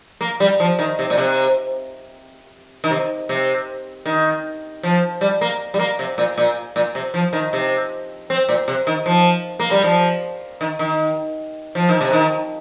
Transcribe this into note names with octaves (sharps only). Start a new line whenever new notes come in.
A#3
G3
F3
D#3
C3
A#2
C3
D#3
C3
C3
D#3
F3
G3
A#3
G3
A#3
C3
A#2
A#2
A#2
C3
F3
D#3
C3
C4
A#2
C3
D#3
F3
A#3
G3
F3
D#3
D#3
F3
D#3
C3
D#3